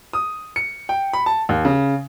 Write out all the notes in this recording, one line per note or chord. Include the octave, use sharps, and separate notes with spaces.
D#6
C#7
G5
B5
A5
D#2
C#3